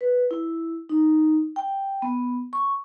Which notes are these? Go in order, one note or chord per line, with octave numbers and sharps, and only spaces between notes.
B4
E4
D#4
G5
B3
C#6